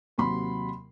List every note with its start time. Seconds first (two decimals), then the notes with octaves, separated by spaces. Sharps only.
0.18 D#2 C3 F#3 B5 C6